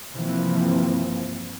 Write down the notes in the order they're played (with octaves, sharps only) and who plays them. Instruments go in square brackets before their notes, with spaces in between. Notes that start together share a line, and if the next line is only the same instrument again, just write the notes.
[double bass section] G2 C3 E3 F3 A#3 C4